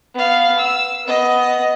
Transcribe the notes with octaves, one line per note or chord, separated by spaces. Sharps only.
B3 F5
E6
B3 D#5